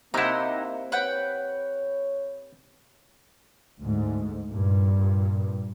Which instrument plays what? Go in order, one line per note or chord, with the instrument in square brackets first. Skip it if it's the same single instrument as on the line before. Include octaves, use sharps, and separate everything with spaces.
[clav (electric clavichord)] C3 E4 [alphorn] A#3 [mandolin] D#4 F#5
[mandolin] B4 F#5 G5 [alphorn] C#5
[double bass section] D2 G#2
G2 A#2